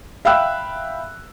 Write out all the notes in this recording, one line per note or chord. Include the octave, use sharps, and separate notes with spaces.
E5 F5 G5 B5 E6 F#6